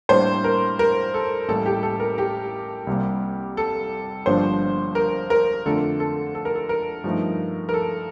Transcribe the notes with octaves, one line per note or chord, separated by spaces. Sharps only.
A2 G3 A#3 D4 C5
A#4
A#4
A4
A1 A2 G3 A#3 A4
G4
A4
A#4
G4
C2 C3 G3 A#3
A4
G1 G2 F3 A#3 D4 C5
A#4
A#4
F2 D3 A3 D4 F4 A4
A4
A4
A#4
A4
A#4
G2 F3 A3 D#4
A#4
A4